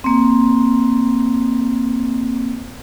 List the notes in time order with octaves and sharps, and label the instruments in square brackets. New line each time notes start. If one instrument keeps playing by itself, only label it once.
[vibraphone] A#3 C4